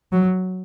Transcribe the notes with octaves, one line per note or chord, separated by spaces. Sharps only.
F#3